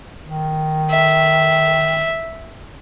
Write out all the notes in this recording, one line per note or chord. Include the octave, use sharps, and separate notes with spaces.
D#3
E5